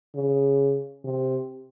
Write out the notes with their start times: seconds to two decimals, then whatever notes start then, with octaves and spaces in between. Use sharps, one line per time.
0.15 C#3
1.04 C3